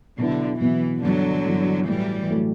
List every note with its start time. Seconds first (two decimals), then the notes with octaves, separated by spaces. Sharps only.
0.18 B2 D3 F#3 B3 E4
0.60 B2 E3 F#3 B3 E4
1.03 G2 D3 E3 F#3 B3 E4
1.46 G2 E3 B3 E4
1.88 A2 E3 F#3 G3 A3
2.30 A2 F#3 A3